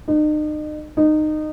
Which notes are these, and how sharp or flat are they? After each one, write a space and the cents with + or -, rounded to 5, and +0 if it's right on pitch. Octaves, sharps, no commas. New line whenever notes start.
D#4 -40
D#4 -20